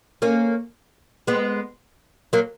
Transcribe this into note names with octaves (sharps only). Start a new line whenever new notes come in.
A#3 C#4
G#3 B3
F#3 A#3